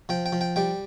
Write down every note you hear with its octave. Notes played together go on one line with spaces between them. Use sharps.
F3 G5
G5
F3
G5
G3 G5